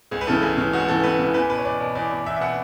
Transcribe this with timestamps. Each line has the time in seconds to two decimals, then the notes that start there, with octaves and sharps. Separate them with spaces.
0.11 C#2 G#4
0.21 B4
0.27 C#3 E3 A4
0.42 C#2 G#4
0.57 C#3 E3
0.73 C#2 F#4
0.88 C#3 E3 A4
1.04 C#2 B4
1.19 C#3 E3
1.34 E2 B4
1.49 B2 B4
1.58 C#5
1.65 E2 D5
1.80 B2
1.95 E2 D5
2.11 B2
2.26 E2 E5
2.36 E5
2.41 B2 F#5